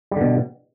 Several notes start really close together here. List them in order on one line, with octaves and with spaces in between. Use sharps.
G3 D3 B2